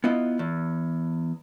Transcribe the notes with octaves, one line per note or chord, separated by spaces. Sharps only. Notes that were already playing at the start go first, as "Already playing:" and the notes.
B3 E4 F4 D#5
E2